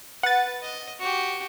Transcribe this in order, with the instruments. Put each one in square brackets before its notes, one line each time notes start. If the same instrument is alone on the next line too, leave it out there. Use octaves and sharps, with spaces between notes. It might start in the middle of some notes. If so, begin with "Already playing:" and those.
[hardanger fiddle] B4 [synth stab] F#5 A6
[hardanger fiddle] D#5
F#4 G4